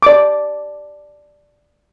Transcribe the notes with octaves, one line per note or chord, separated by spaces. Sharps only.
D5 D6